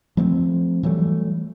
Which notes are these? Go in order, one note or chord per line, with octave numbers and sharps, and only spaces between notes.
F3 A3 A#3 C4
E3 F#3 G3 A3